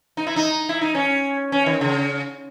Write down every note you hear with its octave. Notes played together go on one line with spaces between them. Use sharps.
D#4
E4
D#4
E4
D#4
C#4
C#4
D#3
C#3